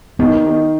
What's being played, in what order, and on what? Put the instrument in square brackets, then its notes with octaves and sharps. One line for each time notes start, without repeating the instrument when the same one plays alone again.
[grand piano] D#3 [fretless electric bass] B3
[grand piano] D#3